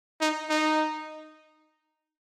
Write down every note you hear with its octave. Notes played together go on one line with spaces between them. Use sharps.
D#4
D#4